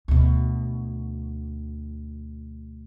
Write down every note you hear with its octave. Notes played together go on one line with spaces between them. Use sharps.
D2 B2